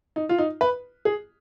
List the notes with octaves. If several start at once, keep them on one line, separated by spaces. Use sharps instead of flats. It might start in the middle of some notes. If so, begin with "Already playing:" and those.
D#4
F4
D#4
B4
G#4